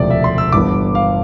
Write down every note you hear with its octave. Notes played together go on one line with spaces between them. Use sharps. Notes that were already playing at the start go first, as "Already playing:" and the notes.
Already playing: E1 D2 C3 F3 D5
E5
C6
E6
G1 G2 E3 B3 D6
F5